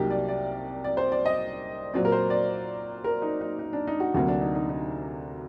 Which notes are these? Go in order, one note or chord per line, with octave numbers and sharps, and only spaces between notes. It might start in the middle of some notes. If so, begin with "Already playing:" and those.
Already playing: C2 C3 F#3 A#3 D#4 G4
D5
D5
D5
C5
D5
D#5
A#2 F#3 C4 D5
A#4
C5
D5
A#4
D#4
D#4
D#4
D4
D#4
F#4
D2 C3 F#3 A#3 F#4
D4
D#4
D#4
D#4